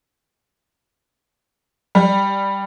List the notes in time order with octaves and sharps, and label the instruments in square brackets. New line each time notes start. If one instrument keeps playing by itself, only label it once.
[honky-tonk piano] G3